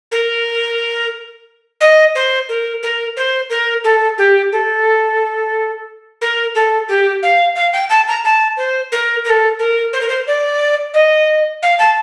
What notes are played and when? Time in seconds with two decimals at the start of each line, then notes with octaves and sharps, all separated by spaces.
0.11 A#4
1.80 D#5
2.15 C5
2.48 A#4
2.82 A#4
3.16 C5
3.49 A#4
3.84 A4
4.17 G4
4.52 A4
6.21 A#4
6.54 A4
6.88 G4
7.22 F5
7.55 F5
7.73 G5
7.89 A5
8.07 A#5
8.24 A5
8.56 C5
8.91 A#4
9.24 A#4
9.29 A4
9.59 A#4
9.93 C5
10.00 A#4
10.08 C5
10.26 D5
10.93 D#5
11.62 F5
11.78 A5